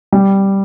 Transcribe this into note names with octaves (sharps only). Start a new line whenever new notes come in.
G3